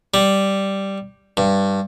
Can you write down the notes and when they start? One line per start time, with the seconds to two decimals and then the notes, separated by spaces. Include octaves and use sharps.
0.14 G3
1.37 G2